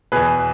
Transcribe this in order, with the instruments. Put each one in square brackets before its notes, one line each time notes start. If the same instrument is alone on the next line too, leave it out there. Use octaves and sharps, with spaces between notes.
[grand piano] E2 B2 G#4 B4